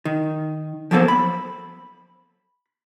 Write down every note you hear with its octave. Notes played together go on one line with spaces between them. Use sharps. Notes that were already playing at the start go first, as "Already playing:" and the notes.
D#3
F3 F#3 A#3 B3 A4 C5
B5